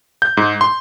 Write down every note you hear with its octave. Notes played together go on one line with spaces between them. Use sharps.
G6
G#2
C6